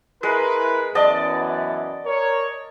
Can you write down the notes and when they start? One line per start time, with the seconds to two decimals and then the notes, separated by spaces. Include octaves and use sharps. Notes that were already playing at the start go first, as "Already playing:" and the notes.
0.23 G#3 E4 A#4 B4
0.95 F#2 E3 B3 D5 D#5 A5
2.06 A#4 C#5